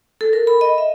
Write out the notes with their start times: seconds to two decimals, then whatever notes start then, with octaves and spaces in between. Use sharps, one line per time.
0.21 A4
0.33 A#4
0.47 B5
0.61 D#5
0.78 E5